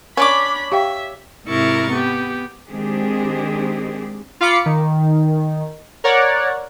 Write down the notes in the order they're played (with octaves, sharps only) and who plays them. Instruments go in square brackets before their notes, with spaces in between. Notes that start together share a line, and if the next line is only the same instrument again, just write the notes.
[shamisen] C#4 [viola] D4 B5 [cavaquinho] C#5 D5 D6
[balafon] G4 F5 G5 [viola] E5
[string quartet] G#2 C3 E4 A#4 C#6 A6
B3 G4
[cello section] D#3 G#3 C4 D4 G4 G#4
[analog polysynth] F4 F5 B5 D6 C#7
D#3
A#4 C#5 D5 F#5